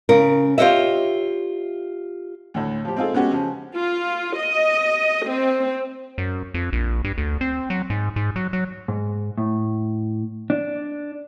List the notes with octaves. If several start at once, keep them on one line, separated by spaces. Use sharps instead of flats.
C#3 C#4 A#4
F4 G4 C5 C#5 D#5 E5
D2 A2
F3 G4
C4 D#4 F4 G#4 A4
G#3 B3 C#4 F#4 G4
C#3 F3
F4
D#5
C4
F#2
F2
A#1
G2
D2
C4
F#3
G#2
G#2
F#3
F#3
G#2
A2
D4